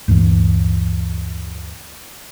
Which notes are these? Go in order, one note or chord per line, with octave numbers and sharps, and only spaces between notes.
D2 G2 A#2 E3